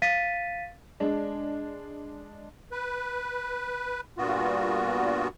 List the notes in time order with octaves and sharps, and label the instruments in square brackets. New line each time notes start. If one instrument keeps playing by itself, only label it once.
[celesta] F5 A6 B6 D#7
[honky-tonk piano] G#3 D4
[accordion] B4
G2 A#2 B3 F4 F#4